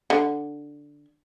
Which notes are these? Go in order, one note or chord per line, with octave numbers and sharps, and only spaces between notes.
D3